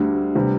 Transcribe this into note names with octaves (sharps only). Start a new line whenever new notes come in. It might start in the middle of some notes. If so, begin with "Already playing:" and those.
Already playing: D2 D3 G3 D4
C3 G3 B3